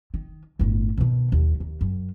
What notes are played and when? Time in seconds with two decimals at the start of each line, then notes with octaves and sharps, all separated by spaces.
0.14 D#3
0.59 G1 A2
0.97 B2 D#3
1.32 D#2
1.60 D#2
1.81 F#2